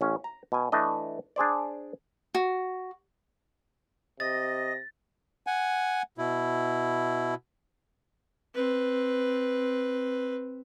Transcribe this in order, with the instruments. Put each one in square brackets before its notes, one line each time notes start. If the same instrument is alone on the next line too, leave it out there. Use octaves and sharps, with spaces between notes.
[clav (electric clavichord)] A1 C#4
A#5
B2 G#5
E3 A3 D4 D#5
D4 G#4 C5 D5
[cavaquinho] F#4
[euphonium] C3 [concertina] D#5 [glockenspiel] A6 [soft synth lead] A#6
[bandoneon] F#5 G#5
B2 E4
[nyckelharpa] C4 B4